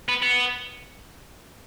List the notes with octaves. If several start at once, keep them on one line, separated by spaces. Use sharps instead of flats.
B3
B3